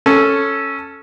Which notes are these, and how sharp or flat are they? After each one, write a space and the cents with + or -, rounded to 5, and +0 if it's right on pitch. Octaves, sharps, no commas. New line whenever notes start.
C#4 +0 A4 +0